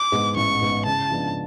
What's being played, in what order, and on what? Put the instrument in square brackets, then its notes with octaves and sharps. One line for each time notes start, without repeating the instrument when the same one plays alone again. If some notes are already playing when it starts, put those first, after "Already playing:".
Already playing: [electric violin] D6
[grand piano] G#2 G#3 B3
[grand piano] A1 [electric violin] C#6
[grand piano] G#2 G#3 B3
[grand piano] C#3 [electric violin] A5
[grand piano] F3 G#3 B3 D4